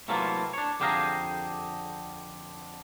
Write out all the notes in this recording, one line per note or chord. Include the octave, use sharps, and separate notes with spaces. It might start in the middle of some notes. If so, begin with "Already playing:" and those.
C3 E3 F#3 A3 A#3 F4
D4 C#5
F2 D3 G4 G#4 F5 A#5